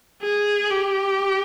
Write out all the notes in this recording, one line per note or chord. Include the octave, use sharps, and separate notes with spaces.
G#4
G4